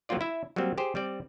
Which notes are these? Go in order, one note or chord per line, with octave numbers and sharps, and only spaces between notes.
F#3 A#3 C4 F4 D5
E4 E5
F#3 G3 A#3 C4
G4 G#4 C5
G3 C4 D5